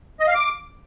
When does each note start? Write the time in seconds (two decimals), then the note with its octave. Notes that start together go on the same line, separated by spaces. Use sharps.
0.20 D#5
0.27 F5
0.35 D6